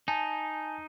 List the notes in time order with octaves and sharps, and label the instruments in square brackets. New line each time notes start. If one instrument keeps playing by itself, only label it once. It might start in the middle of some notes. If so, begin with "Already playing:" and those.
[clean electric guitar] D#4 [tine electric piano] G#5 A5